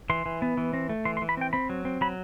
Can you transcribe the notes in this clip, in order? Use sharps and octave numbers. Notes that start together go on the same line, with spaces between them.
E3 C6
E3
B3
E3
C4
A3
E3 C6
C6
E3
B5
C4 G5
C4 B5
F#3
C4
F#3 B5